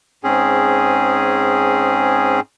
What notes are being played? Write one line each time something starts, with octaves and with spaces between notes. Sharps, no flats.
G#2 C4 C#4 G#4